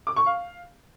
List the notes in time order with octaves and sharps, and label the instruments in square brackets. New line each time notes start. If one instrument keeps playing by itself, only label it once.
[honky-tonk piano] D6
C#6
F5